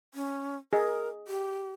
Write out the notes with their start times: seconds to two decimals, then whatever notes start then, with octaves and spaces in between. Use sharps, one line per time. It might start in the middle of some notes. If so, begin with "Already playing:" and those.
0.14 C#4
0.73 G#4 A#4 D#5
1.28 G4